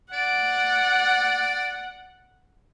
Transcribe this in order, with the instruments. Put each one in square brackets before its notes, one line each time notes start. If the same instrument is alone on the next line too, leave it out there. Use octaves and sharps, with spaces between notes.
[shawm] D5 [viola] F#5